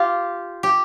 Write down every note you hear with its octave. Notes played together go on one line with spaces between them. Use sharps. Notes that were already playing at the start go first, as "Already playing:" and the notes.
Already playing: F4 G4
G4